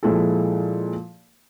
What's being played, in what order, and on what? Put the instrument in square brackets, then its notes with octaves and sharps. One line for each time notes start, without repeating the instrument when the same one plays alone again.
[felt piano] A#2 F3 G#3 E4 A4